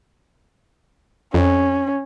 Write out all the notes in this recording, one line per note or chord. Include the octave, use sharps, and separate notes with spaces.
F2 C#4